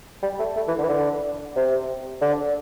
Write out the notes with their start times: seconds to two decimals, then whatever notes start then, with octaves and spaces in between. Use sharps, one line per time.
0.23 G3
0.39 A3
0.56 A3
0.68 E3
0.78 D3
0.84 E3
0.89 D3
1.56 C3
2.21 D3